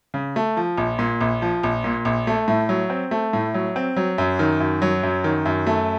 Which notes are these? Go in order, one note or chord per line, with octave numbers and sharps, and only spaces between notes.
C#3
A3
F3
A#1
A#2
A#1
F3
A#1
A#2
A#1
A3
A2
F#3
C4
A3
A2
F#3
C4
F#3
F#2
D#3
F#2
F#3
F#2
D#3
F#2
A3